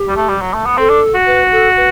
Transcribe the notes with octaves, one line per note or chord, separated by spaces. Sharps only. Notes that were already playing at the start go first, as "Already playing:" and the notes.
Already playing: G4
G3
A3
G3
F#3
A3
B3
C4 A4
D4
F#4
B4
A4
B4